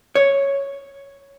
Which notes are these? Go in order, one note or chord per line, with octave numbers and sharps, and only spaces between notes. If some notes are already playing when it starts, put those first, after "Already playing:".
C#5